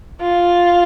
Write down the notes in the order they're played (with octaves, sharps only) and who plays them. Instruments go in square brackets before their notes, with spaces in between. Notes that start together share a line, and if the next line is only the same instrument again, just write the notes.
[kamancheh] F4